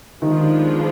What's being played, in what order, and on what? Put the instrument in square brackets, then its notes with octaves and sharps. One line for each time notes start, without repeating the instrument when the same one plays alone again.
[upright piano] D#3 [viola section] F3 G#3 B3 D4 F4